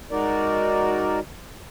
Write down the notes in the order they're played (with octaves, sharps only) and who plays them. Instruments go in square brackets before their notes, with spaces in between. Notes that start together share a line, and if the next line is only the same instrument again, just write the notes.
[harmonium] G#3 D#4 F#4 A#4 D5